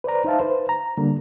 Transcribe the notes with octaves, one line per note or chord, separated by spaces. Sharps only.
B4 C5 D5 A#5
D#4 C5 E5 F5 A5
B4 C5
A#5
D3 G3 A#3